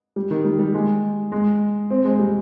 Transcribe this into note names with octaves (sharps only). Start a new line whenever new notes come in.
G3
D#3
G3
G3
G#3
G#3
C4
G#3
G3